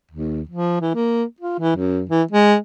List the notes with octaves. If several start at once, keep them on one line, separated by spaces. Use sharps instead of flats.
D#2
F3
E3
A#3
F4
E3
F#2
E3
G#3